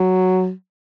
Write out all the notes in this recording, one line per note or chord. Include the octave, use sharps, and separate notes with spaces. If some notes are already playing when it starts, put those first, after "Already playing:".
Already playing: F#3